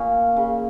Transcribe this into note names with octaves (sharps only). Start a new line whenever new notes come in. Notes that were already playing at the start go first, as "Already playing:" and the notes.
Already playing: A#2 C#4
C#3